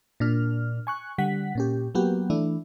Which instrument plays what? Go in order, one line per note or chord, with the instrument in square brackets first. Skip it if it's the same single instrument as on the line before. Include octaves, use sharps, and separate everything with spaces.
[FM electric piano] A#2 D4 F6
G#5 C#6 F#6
D3 G3 F#5 B6
A#2 C#4 G4
F#3 A#3 B3 F#4 G4
E3 A3 D4 E4